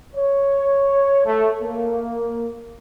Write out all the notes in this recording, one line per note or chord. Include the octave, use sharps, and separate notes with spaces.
C#5
A3
A#3